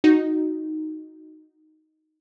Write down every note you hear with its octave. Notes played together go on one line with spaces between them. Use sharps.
D#4 F#4